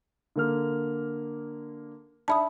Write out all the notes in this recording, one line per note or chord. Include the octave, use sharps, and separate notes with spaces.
D3 A#3 F6
D4 E5 A5 B5 D#6